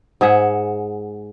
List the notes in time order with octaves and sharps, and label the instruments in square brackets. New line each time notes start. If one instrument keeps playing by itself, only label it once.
[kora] G#2 G#4 E5 F#5